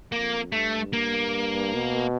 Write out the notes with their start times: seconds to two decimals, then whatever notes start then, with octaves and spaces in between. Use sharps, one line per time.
0.12 F2 A#3
0.52 G2 A3
0.93 A#3
1.74 B2